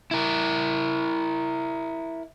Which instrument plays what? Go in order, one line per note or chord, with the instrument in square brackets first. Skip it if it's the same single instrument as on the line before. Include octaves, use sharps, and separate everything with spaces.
[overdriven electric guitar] E4 A#4